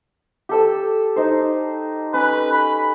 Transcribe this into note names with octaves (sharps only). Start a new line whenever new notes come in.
G4 A4 E6
D#4 C5
C#4 B4
B5